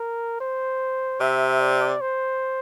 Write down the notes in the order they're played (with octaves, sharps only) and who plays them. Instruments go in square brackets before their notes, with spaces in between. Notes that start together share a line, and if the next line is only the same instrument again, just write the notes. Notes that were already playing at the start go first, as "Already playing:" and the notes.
Already playing: [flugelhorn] A#4
C5
[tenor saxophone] C3 [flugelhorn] E5
[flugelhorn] D5
C5